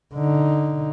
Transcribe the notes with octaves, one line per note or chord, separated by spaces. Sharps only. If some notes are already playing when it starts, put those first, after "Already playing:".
D3 D#4